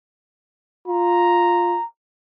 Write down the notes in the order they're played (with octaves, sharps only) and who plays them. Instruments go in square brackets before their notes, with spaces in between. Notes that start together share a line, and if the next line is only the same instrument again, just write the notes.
[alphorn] F4 [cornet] A#5